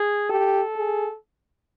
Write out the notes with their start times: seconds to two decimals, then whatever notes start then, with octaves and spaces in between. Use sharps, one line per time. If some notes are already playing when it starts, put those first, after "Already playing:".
Already playing: G#4
0.30 G4 A4
0.76 G#4